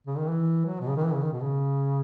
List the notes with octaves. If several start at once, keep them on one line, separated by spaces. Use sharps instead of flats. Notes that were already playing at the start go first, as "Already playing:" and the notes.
C#3
D#3
E3
F#3
B2
C#3
D#3
E3
C#3
D#3
B2
C#3